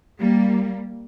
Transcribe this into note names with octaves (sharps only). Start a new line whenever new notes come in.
G3 A#3